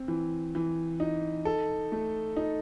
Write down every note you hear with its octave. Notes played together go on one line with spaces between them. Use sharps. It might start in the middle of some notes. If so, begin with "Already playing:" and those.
Already playing: C4
E3
E3
D#4
A4
A3
D#4